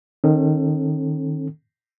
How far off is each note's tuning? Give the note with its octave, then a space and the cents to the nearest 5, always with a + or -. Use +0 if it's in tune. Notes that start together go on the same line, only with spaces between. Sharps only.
D#3 -10 C#4 -45 A4 +0